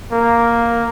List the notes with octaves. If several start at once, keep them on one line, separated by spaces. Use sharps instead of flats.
A#3